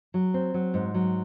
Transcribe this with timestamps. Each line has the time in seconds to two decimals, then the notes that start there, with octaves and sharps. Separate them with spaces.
0.14 F#3
0.34 C4
0.54 F#3
0.74 G#2
0.94 F#3